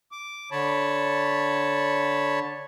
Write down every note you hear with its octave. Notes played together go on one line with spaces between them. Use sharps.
D6
D3 C#5 A5 B5